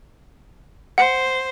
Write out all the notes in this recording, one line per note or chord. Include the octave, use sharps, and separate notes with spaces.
C5 F#5